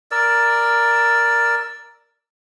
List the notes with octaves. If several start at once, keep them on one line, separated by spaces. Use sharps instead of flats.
A#4 D5 E6